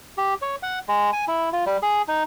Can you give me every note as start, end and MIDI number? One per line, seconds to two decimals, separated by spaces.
0.18 0.34 67
0.42 0.56 73
0.63 0.79 78
0.88 1.10 56
1.13 1.25 80
1.28 1.49 64
1.53 1.65 65
1.66 1.77 55
1.82 2.02 68
2.08 2.23 63